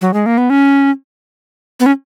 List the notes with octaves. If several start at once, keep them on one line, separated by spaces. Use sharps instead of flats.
F#3
G#3
A#3
B3
C#4
B3
C#4